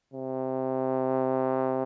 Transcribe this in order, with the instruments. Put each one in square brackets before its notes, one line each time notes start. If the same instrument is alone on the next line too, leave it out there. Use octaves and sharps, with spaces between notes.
[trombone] C3